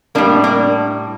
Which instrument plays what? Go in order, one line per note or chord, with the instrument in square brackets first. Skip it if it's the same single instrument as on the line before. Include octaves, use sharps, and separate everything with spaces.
[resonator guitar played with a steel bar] A2 G3 A#3 D4
A#3 D4